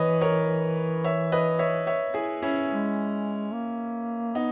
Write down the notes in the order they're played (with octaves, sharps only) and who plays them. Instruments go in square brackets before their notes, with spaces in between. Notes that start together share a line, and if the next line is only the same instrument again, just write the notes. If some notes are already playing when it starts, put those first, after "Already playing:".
Already playing: [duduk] E3 [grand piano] B4 C#5 D#5
[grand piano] A#4 C#5
C#5 E5
B4 D#5
C#5 E5
C#5 E5
E4 G#4
C#4 E4
[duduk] G#3
A#3
[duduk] B3 [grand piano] D#4